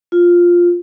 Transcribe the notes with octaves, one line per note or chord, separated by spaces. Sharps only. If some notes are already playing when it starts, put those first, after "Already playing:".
F4